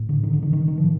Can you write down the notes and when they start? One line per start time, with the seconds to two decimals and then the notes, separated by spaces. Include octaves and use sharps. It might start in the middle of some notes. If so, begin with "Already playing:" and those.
Already playing: A2
0.09 D3
0.23 D#3
0.33 D3
0.43 D#3
0.53 D#3
0.68 D#3
0.78 F3
0.83 A2